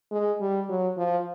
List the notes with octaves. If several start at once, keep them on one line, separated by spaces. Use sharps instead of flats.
G#3
G3
F#3
F3